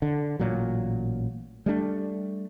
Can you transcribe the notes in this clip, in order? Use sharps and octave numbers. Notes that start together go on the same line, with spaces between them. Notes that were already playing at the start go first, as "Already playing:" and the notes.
D3
A1 A#2 F#3
G3 A3 D4